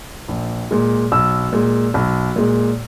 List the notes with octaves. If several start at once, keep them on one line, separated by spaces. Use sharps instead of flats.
A#1
A#2 G#3
B1 E6
A#2 G#3
B1
A#2 G#3